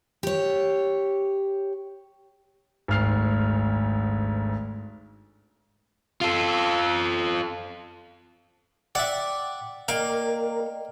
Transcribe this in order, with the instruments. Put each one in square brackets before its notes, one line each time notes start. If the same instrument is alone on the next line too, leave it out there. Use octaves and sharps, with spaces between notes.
[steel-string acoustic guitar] G4 C#5
[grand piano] G#1 D2 F6 C7
[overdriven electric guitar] F4 A4
[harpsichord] D5 E5 [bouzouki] F#5 [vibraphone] G5 D6
[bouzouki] A#3 [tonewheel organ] A#4 [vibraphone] D5 D#5 G5 [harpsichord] F5